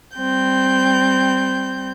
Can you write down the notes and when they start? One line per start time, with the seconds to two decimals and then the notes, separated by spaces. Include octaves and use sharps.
0.16 G3 C4 G6